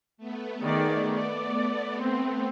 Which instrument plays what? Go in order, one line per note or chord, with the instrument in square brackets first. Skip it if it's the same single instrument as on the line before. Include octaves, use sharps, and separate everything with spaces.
[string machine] A3 B3
[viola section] D#3 G#4 D5
D5
C4